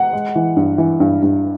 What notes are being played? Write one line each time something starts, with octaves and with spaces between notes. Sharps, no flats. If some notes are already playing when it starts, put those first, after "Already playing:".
Already playing: F#5
G#3
E3
G2
E3
G2
G2